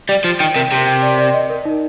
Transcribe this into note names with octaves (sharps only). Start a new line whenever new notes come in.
G3 D5
F3 D5
D#3 G5
C3 A#4
C3 G5
G5
D5
D5
D#5
A#4
D#4